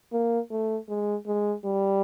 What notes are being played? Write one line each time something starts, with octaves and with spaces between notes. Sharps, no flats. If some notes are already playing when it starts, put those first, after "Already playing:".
A#3
A3
G#3
G#3
G3